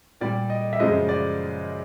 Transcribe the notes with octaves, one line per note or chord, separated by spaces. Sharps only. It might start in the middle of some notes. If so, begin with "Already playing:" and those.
A#2 G3 D5
D#5
E5
F#2 C#3 F3 G#3 D#5
D5